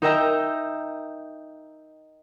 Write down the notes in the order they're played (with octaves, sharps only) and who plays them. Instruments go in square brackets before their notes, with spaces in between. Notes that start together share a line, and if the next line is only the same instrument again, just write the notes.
[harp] D#4 A#4 D#5 E5 G5 A#5